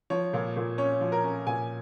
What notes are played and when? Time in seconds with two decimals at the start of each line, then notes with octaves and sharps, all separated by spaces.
0.10 F3 C#5
0.33 A#2
0.56 A#2
0.78 C#4 C#5
1.01 F3
1.12 A#4
1.24 C#4
1.47 A#2 G#5